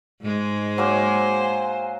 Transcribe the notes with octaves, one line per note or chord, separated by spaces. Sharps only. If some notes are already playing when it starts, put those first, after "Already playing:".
G#2 G#3
F#3 A#3 C5 G#5